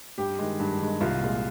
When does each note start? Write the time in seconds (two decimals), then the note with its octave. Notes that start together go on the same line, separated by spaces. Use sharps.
0.18 G2 G4
0.38 D#3 G#3
0.59 G2
0.81 D#3 G#3
1.01 C2 F4
1.21 A#2 G#3